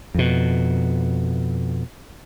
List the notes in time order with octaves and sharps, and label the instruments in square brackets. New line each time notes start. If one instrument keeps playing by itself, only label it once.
[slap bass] F2 B2